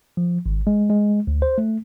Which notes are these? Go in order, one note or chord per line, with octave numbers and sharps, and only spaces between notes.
F3
G#1
G#3
G#3
D2
C5
A3